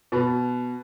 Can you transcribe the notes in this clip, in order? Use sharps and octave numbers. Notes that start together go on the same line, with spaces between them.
B2 B4